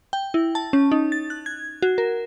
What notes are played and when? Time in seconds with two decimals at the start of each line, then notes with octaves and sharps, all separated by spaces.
0.13 G5
0.34 E4
0.55 A5
0.73 C#4
0.92 D#4
1.12 A6
1.30 F#6
1.46 G#6
1.82 F#4
1.98 A#4